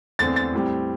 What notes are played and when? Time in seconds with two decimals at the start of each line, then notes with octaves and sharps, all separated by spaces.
0.19 E2 D3 A3 C4 A6
0.36 A6
0.53 A2 G3 C4